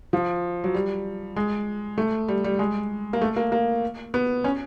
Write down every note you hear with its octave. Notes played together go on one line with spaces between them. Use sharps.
F3
F#3
G3
G#3
A3
G3
G3
G#3
A#3
A3
A#3
A#3
B3
C#4